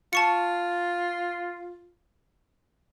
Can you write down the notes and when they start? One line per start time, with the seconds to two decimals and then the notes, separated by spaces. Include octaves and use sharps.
0.13 F4 A5 C#6 C#7